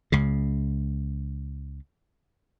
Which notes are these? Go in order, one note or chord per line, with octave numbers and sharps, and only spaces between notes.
C#2 C#3